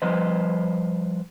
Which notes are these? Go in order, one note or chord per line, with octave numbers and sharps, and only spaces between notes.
F3 G3 B4 C5 D#5